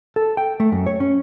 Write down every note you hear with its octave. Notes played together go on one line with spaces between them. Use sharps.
A4
G5
A3
F#2
C#5
C#4